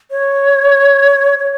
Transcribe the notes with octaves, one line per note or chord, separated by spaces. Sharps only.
C#5
C#5